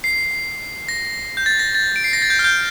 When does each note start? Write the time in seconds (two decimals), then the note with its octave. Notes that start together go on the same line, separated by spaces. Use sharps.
0.04 C7
0.89 A#6
1.37 G6
1.46 A6
1.59 A#6
1.75 A6
1.96 D7
2.04 C7
2.13 A#6
2.22 A6
2.30 G6
2.39 F6
2.44 G6